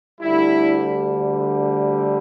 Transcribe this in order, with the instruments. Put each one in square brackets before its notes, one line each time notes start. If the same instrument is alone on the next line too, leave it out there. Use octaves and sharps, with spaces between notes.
[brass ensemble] D2 D3 G3 E4